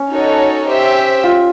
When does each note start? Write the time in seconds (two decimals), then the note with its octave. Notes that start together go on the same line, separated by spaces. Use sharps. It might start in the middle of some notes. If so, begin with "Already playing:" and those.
Already playing: C#4
0.11 D#4 F#4 A4 C#5
0.68 G4 C5 E5
1.24 F4